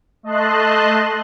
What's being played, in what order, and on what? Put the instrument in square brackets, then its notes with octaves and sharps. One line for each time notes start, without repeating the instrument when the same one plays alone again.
[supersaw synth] A3 D#5 A5 C6 F#6